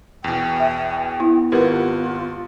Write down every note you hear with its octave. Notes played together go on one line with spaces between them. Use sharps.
E2 B2 G5
E5
B3 E4
G#1 F4 G4 A#4 B4 F#5